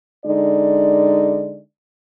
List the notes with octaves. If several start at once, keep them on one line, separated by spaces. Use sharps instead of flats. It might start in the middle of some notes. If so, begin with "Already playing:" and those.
D3 G#3 D#4 D5